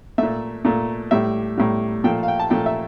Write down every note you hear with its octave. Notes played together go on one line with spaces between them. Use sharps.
A#2 A3 E5
A#2 A3
A2 G3 E5
A2 G3
A#2 F3 A3 G5
F5
G5
A5
A#2 F3 A3 G5
E5